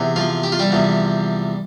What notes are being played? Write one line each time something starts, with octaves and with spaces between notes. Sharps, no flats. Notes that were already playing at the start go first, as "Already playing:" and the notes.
Already playing: E2 C3
F3 F4
G4
F4
G3 G4
E2 C3 F3